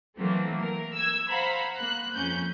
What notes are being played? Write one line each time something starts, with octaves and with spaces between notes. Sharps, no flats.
E3 F#3 A3 A#3 C4
A#4
E6 G#6
C5 F5 F#5 A#5 B5
A#3 F#6
F2 C#4 G6